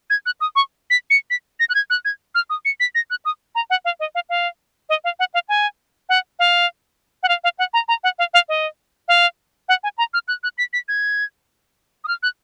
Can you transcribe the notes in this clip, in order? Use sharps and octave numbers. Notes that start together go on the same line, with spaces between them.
G#6
F#6
D#6
C#6
B6
C#7
B6
A#6
F#6
G#6
F#6
G#6
F6
D#6
C#7
B6
A#6
F#6
D#6
A#5
F#5
F5
D#5
F5
F5
D#5
F5
F#5
F5
G#5
F#5
F5
F#5
F5
F5
F#5
A#5
A#5
F#5
F5
F5
D#5
F5
F#5
G#5
A#5
F6
F#6
F#6
B6
B6
G#6
D#6
F6
F#6